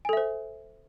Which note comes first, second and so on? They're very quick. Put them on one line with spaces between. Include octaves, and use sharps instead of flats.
G#5 A4 E5 C5